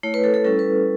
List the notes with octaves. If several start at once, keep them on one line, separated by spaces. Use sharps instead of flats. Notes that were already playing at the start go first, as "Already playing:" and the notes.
A3 E4 C#5
B4
A4
A4
G3 C#4 E4 A4
B4